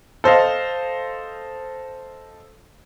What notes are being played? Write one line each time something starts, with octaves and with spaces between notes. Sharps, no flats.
A4 C5 D#5 F5